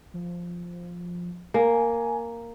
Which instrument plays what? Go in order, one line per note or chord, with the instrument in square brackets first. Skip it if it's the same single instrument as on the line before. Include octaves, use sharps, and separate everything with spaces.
[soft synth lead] F3
[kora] A#3 [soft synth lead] G#5